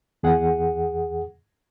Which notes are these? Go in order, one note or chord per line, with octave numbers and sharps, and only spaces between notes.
E2 G#4 F#5